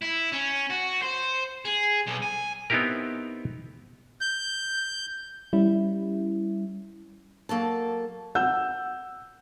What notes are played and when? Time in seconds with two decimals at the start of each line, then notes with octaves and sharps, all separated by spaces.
0.02 E4
0.33 C#4
0.70 F#4
1.02 C5
1.65 G#4
2.07 B1
2.23 G#5
2.70 B3 C4 D#4 E4 G4 A#4
4.21 G6
5.53 G3 C#4 E4
7.49 F#3 A#3 A4 A5
8.35 F#5 E6 G6